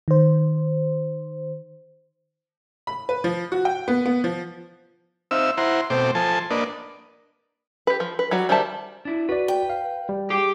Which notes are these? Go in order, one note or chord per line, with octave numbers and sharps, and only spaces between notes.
D#3 C5
B5
B4
F3
F#4
G5
B3
B3
F3
C4 D#4 E5 F5 E6
E4 C5 F#5 A#5 C6
B2 A3 C4 C5 G5 D6
F3 A4 G#5 A5 C6
A#3 D4 B4 D5 D#5
G4 B4
F3
B4
F#3 G3 F#4
D#3 G3 C5 E5 A5
D4 E4
F#4 B4 D5
G5
F5
G3
G4 G#4